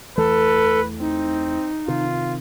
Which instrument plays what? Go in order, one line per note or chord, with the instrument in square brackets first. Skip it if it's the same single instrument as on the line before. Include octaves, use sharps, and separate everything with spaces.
[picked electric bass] E2 E3 A3 [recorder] A4 [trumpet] B4
[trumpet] C4 [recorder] D#4
[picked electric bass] C3 D#3 [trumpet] F4